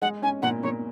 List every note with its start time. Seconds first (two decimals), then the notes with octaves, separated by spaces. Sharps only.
0.02 G#3 F#5
0.22 C#4 G#5
0.42 A#2 F#5
0.63 A#2 C#5